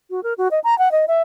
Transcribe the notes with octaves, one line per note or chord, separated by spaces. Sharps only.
F#4
A#4
F#4
D#5
A#5
F#5
D#5
E5